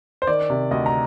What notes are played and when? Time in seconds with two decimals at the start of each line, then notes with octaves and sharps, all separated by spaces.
0.22 C5
0.27 D#3 D5
0.50 C3
0.71 D2 D#5
0.86 A#5